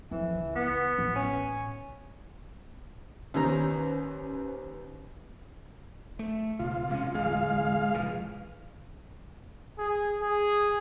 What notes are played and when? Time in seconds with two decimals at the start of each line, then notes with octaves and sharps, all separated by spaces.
0.11 F2 E3
0.34 C#2
0.56 B3
0.98 A1
1.16 C#4
3.34 D#2 D#3 C#4 B4 C5 A#5
6.19 A3
6.59 C#2 B2 F4
6.89 C3 G#3 C#4
7.15 D1 E2 D3 G#3 F5
7.94 F1 A#2 E3
9.78 G#4
10.21 G#4